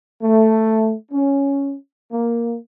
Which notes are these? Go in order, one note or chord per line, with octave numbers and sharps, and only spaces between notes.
A3
C#4
A#3